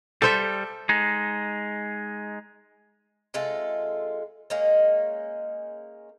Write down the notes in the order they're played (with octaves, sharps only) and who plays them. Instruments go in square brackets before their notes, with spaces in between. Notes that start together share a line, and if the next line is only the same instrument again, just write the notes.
[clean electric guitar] G3 [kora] A4 C5 E5
[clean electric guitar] G#3 D#4
[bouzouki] C3 G#3 F4 A4
G#3 A#3 C#4 D#4